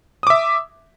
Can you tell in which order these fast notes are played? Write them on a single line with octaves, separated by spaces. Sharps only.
D#6 D6 E5